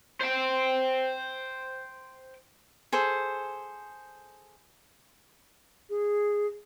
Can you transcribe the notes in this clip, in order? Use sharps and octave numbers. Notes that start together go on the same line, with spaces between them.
C5 G5
G#4 A4 C5
G#4